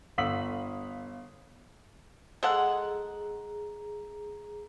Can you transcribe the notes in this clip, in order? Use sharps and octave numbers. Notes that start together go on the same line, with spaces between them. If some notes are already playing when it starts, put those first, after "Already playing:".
G1 F5 D#6 E6 B6 F#7
G#3 G#4 A4 F#5 A#5